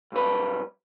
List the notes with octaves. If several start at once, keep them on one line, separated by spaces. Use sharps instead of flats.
B1 G2 B4